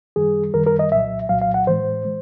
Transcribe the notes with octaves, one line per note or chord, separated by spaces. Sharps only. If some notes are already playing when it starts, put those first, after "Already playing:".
F#2 D#3 G3 G#4
F#2 D#3 G3 A#4
A#4
D#5
C2 A#2 F#3 E5
C2 A#2 F#3 F5
F5
F#5
A2 E3 G#3 C5
E3 G#3